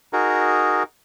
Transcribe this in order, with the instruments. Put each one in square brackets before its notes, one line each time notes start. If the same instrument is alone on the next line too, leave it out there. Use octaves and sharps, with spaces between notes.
[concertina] D#4 F#4 G#4 A#4